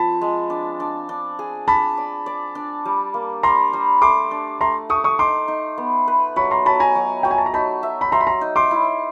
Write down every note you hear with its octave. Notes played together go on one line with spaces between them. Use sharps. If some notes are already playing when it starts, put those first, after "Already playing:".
Already playing: F3 C4 A5 B5
G#3
D4
D4
D4
G#4
D4 A5 B5
D5
D5
D4
G3
A#3
G3 A#5 C6
G3
A3 C6 D6
D4
A3 A#5 C6
A3 C#6 D#6
C#6 D#6
D#4 C6 D6
D#4
B3
B4
F#3 B5 C#6
A#5 C6
F#3 A5 B5
G#5 A#5
F#3
F#3 G5
G#5
A5
A#5
D#4 A5 B5
E5
B5
E5 A#5 C6
B5
A#5 C6
D#4
C6 D6
E4